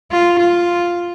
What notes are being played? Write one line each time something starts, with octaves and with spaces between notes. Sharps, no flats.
F4
F4